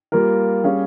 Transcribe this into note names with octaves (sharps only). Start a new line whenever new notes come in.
G3 A#3 F4 A#4
G3 C#4 G#4 C#5 F5